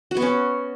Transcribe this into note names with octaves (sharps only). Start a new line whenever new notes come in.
F#4
B3
C#4